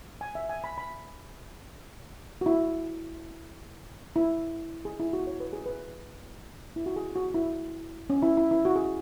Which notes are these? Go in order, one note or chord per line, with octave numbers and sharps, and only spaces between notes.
G#5
E5
G#5
B5
B5
F#4
E4
E4
G#4
E4
F#4
C#5
B4
G#4
B4
E4
F#4
G#4
F#4
E4
C#4
E4
E4
E4
F#4
G#4